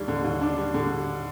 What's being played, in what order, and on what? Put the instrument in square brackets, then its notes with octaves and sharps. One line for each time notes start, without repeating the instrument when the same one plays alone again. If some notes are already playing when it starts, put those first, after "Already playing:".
Already playing: [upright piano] D#2 G3 D4
D3
D#2
D4
G3
D3